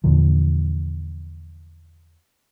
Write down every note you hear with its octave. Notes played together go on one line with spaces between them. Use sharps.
E2 A#2 D3 F3